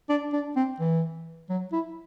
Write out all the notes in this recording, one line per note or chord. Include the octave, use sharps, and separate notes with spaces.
D4
D4
C4
E3
F#3
E4